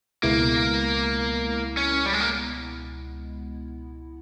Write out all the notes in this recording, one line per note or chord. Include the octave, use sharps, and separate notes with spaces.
C#2 B2 G#3 A#3 B3 E4
C#4
G3
G#3
A#3